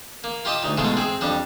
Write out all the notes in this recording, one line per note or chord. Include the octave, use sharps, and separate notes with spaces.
A#3
F4 G4 D#5 A5
D2 D#4
G#2 B2 G#3 A3 F4
C4 G#4
F2 G3 D4